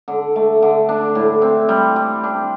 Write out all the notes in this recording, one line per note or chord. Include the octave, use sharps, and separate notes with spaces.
D3
A3
D3
D4
A2
C4
G3
G3
D4